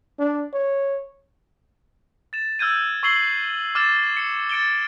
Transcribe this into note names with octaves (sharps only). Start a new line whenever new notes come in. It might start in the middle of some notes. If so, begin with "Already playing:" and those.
D4
C#5
A6 E7
E6 F6 G6 G#6 D#7
C#6 E6 G#6 C7 F#7 G7
D6 F6 A6 E7
C#7
A6 C#7 D7 E7 G7